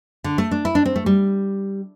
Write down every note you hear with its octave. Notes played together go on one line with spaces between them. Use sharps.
D3
A3
D4
E4
D4
C4
A3
G3